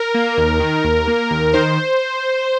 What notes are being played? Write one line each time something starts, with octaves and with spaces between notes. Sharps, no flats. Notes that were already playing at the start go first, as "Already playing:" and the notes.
Already playing: A#4
A#3
D#2
D#3
D#2
A#3
D#2
D#3 C5